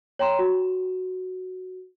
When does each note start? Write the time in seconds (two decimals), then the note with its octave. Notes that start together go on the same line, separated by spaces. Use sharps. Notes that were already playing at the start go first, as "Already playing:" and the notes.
0.19 C#5 G5 A#5 C6 E7
0.39 F#4